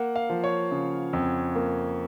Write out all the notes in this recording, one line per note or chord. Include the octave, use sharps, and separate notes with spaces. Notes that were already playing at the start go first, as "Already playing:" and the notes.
Already playing: A#3 F#5
F5
F3
C#5
C#3
F2
A#3